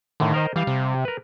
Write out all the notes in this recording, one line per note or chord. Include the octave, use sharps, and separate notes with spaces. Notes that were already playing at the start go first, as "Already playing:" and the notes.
A2 D3 D#3
A#4 C5 D#5
E3 G3 F5
C3
A#4 B4